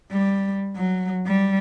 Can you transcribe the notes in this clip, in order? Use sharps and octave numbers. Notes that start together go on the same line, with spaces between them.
G3
F#3
G3